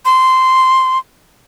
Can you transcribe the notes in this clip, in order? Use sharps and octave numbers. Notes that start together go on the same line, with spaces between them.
C6